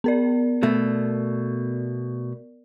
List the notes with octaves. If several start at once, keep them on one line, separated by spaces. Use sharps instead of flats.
B3 A#4 D5
B2 A3